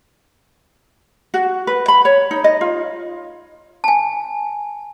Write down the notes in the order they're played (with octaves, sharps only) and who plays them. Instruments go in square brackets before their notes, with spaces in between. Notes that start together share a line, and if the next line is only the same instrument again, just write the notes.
[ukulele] F#4
B4
B5
C#5
D#4
D#5
F4
[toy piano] G#5 A5